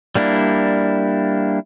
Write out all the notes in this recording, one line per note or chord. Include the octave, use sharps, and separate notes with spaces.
G3 A#3 D4 E4